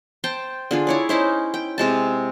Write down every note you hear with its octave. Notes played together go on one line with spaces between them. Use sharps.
C5 G5 A5
D3 F4 G#4
E4 C#5 D5
C#4 D#4 E4 C5
G5
C3 G#3 A5